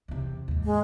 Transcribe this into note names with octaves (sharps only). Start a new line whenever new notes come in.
E2 C3
D#2 G#2
G#3